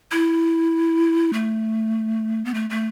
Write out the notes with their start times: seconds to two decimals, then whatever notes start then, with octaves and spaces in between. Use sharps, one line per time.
0.12 E4
1.33 A3
2.45 B3
2.54 A3
2.70 A3